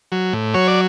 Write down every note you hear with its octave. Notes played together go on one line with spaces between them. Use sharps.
F#3
A2
F#3 C#5
D5